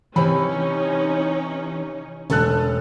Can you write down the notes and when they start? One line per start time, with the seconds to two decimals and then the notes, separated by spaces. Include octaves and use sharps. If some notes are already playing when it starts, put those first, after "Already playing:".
0.16 C3 E3 C4 C#4 D#4 C#5 B5
2.30 E1 C#4 A4 F#6